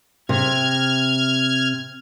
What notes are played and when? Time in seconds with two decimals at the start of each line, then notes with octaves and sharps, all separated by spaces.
0.29 C3 F6 G#6